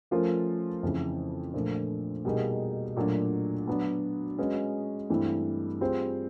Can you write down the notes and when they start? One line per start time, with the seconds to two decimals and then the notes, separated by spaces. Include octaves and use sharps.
0.11 F3 A3 C#4 F4 A#4
0.83 F2 C#3 E3
1.54 A#2 F3 A3 D4
2.25 B2 G3 A#3 D#4 G#4
2.96 A#2 F#3 A3 D4 F#4
3.67 F#3 B3 D4
4.38 G#3 C#4 F#4 B4 D#5
5.10 G2 E3 A3 C4 E4
5.81 G3 C4 F4 G#4 C5